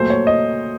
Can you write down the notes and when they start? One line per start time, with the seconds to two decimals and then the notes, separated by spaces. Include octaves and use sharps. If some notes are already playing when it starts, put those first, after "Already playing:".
Already playing: A#2 F#3 A3 C5
0.10 C#5
0.27 D#5